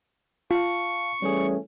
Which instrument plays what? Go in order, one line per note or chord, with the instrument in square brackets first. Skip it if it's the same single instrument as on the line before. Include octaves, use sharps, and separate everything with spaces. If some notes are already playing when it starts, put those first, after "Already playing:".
[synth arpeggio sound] F4 [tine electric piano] F5 A5 [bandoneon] C#6
[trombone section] E3 A3 C#4 [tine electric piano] G3 G#4